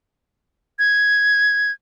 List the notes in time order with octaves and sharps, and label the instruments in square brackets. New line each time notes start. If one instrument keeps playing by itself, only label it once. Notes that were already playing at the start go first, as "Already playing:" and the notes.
[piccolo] G#6